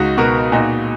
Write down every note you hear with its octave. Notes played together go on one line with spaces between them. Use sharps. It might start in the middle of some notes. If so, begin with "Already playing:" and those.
Already playing: C#2 D#4 F#4
B2 F#4 A#4
A#2 D#4 F#4